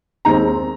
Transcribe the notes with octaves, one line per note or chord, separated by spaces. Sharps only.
D#2 D#3 G#3 C4 A#5